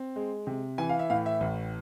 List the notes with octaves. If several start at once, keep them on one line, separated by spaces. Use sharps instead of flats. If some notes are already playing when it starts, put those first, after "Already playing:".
Already playing: C4
G#3
C3
E3 G#5
F5
E5
A2 F5
E5
A1